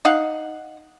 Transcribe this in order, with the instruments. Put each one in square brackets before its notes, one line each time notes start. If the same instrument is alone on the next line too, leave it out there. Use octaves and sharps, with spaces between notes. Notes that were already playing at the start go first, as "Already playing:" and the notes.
[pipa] D#4 F5 F#5